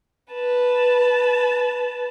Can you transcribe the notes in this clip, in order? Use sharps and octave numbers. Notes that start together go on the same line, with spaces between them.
B4 A5